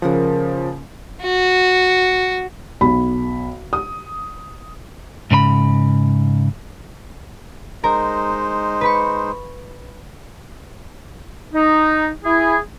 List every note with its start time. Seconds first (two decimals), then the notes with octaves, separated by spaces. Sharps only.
0.02 C#3 F3 A#3 A#4 F#5
1.23 F#4
2.81 B1 B5
3.73 D#6
5.31 G#2 C#3 A#4 B5
7.84 G#3 D#4 A#4 C5
8.81 B4 B5 C#6
11.54 D#4
12.24 E4 G#4